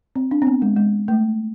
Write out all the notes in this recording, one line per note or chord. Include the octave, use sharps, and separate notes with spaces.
C4
D4
C4
B3
G#3
G#3
A3